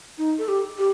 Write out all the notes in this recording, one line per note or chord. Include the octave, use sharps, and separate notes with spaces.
D#4
A4
G4
G4